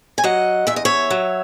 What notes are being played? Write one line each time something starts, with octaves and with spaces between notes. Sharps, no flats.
G#5
F#3 D#5 F#5
E2 E5
D#5
C#5 E5
F#3